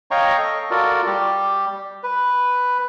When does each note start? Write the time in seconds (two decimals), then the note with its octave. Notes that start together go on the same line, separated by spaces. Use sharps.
0.11 C#5 D#5 F5 G5 A#5 C#6
0.38 A4 D#5
0.71 F4 F#4 A4 A#4 D5
1.06 G3 G4
2.03 B4